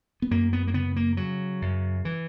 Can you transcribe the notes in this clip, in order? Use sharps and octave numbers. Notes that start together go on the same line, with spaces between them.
B3
F#2 A#3
B3
A#3
C#3 B3
A#3
C#3 F#3
F#2
E3